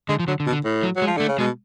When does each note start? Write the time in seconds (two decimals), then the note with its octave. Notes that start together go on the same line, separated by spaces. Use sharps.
0.09 D3 G#3
0.19 F3
0.28 D3 F#3
0.40 D3
0.46 B2
0.52 D3
0.65 A2
0.83 F#3
0.96 F#3
1.02 G#3
1.07 F3
1.17 D3 A3
1.28 C#3
1.38 B2 G#3